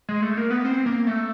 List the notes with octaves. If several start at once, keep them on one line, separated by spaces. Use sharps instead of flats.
G#3
A3
A#3
B3
C4
A#3
A3